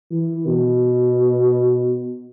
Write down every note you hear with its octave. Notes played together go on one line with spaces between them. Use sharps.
E3
B2